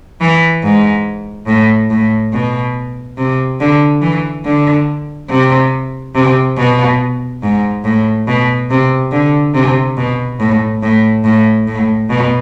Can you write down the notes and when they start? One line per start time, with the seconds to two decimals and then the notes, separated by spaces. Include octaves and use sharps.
0.21 E3
0.63 G#2
1.47 A2
1.90 A2
2.33 B2
3.18 C3
3.60 D3
4.02 E3
4.45 D3
5.30 C3
6.15 C3
6.58 B2
7.43 G#2
7.84 A2
8.27 B2
8.70 C3
9.12 D3
9.54 C3
9.97 B2
10.40 A2
10.83 A2
11.24 A2
11.67 A2
12.10 B2